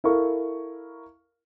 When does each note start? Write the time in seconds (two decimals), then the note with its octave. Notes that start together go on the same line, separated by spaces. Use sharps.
0.04 E4 A4 A#4 F5 C#6